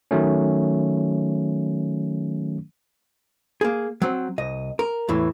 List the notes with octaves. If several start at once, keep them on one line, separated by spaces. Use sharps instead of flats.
D#3 F#3 A3 C#4
A#3 G#4
F#3 C4
C2 D#5
A#4
E2 A2 E3